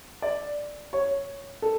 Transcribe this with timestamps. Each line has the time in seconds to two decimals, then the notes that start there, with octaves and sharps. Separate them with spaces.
0.22 D5
0.93 C#5
1.62 A4